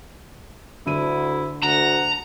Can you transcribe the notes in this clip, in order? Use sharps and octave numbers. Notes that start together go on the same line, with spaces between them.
D2 D3 E4 D#7
D2 F#5 A#5